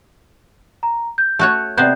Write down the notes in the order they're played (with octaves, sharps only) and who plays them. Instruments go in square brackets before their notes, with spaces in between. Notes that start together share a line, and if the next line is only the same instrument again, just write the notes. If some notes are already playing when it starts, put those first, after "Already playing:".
[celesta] A#5
G6
[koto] A3 F#4 C#5
[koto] C3 B3 C5 [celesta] D5 F#5 G6